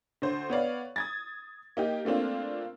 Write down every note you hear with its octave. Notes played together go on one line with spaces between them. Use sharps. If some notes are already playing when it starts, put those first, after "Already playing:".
D2 C5
B3 C#5 D5 F5
D#6 G#6 A6
A#3 D#4 G4
A3 A#3 C4 D4 F4